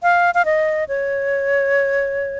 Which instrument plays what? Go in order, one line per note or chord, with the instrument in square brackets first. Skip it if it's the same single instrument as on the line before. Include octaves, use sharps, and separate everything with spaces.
[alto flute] F5
F5
D#5
C#5